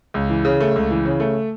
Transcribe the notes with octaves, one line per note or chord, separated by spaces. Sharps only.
C#2
E3
C#3
A3
C#2
E3
C#3
A3